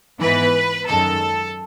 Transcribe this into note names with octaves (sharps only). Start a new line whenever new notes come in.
G#2 E3 B3 B4
F#2 D#3 G#3 A4